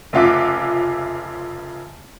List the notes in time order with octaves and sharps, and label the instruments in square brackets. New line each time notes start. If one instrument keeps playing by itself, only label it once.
[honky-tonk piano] F1 C#3 F4 E5 F#5 D6